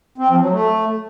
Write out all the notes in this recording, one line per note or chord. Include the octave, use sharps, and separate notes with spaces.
C4
F3
F#3
A3